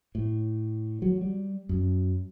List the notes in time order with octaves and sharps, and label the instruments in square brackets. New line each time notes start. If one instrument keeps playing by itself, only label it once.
[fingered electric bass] A2
F#3
G3
F#2